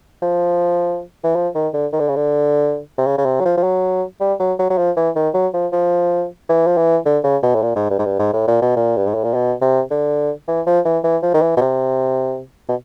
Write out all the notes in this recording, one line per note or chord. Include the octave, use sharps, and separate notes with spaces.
F3
E3
F3
D#3
D3
D#3
D3
C#3
D3
C3
C#3
C#3
C3
F#3
F3
F3
F#3
G3
F#3
F#3
F#3
F3
E3
D#3
F#3
F3
F3
E3
F3
E3
D3
C#3
B2
A2
A#2
G#2
G2
G#2
G2
G#2
A2
A#2
B2
A#2
G2
G#2
A2
A#2
B2
C3
D3
E3
F3
E3
E3
F3
D#3
E3
B2
C3
B2